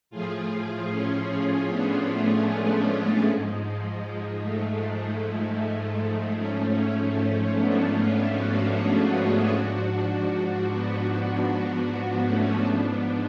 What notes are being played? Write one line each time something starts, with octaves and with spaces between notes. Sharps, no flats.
A2 F3 F4 G#4
F4 G#4
C#4 F4
B3 D4
A3 C#4
G#3 B3
G#2 F3 G#3
G#3
A3
G#2 F3 A3 C#4
A3 C#4
B3 D4
C#4 F4
D4 F#4
F4 G#4
G#2 F3 D4 F#4
D4 F#4
D4 F#4
B3 D4
B3 D4
A3 C#4
G#2 F3 B3 D4